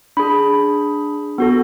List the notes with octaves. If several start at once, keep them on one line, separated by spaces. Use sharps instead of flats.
D4 G#4 B5
B3 F#4 A4